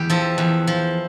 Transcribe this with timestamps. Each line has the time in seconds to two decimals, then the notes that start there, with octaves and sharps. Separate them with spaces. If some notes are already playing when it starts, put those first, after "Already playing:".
Already playing: E2 G4
0.10 F3 A4
0.38 E2
0.67 F3